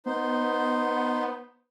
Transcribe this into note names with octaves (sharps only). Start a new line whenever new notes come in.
B3 D#4 C5